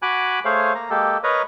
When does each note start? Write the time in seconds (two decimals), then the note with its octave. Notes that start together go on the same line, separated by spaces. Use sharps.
0.02 F#4 G#5 B5 D6 F#6
0.45 A3 G#4 C5 C#5 F5
0.75 A#3 A#5
0.90 G#3 A#3 G4 A4
1.23 A#4 B4 C#5 D#5 A#5